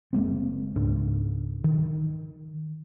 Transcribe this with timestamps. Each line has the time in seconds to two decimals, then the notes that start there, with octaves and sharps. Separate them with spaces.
0.13 F#1 G#3 A#3 C4
0.76 C#2 G#2 D4
1.64 D#3